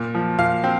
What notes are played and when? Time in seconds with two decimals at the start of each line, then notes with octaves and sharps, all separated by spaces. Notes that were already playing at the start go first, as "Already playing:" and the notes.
Already playing: A#2
0.15 F3
0.39 A#2 F5
0.64 C4